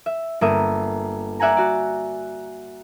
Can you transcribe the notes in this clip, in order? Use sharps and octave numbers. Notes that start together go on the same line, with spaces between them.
E5
G1 A#3 E5 D#6
D5 E5 F#5 G#5 A#5
F#4 D5